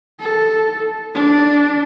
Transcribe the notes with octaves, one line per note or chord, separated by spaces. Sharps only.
A4
D4